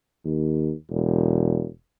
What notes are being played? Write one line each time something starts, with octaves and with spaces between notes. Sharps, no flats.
D#2
E1